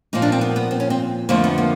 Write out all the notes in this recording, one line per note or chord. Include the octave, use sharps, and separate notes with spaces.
A#2 F3 A#3 D#4
D4
C4
B3
B3
C4
C#4
C4
F2 D3 F3 A3 A#3
B3
A#3